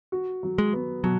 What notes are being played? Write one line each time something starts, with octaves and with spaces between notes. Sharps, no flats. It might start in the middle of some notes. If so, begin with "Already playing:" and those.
F#4
F#3
G#3
B3
B2 F#3